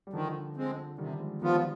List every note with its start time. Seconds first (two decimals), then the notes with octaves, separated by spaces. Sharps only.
0.07 G3
0.13 D3 D#3 F3
0.56 G#3 C4
0.98 C3 D#3 G3
1.20 F3 G#3
1.42 D#3 F3 G3 B3 F4